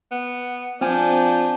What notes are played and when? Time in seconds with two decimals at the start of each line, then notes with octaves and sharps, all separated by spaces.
0.11 B3
0.81 F3 C4 D4 G#5 G6